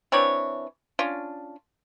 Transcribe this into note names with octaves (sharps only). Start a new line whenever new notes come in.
E3 C4 D4 C#5
C#4 D4 F4